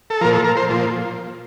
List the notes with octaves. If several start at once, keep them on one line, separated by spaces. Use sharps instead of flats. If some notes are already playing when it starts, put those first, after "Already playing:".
A4
A#2 F3 A#4
A4
A#4
C5
A#2 F3